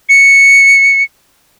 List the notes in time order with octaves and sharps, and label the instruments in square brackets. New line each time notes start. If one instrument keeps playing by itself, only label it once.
[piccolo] C#7